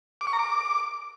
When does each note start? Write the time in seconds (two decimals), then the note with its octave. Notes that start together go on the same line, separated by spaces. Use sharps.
0.21 D6
0.27 C#6
0.33 A#5
0.39 D6